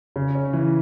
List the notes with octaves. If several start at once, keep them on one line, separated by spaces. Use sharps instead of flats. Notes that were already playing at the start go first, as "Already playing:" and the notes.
C#3
C#4
E3